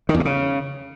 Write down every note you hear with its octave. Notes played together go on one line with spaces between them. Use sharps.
D#3
E2
C3
C#3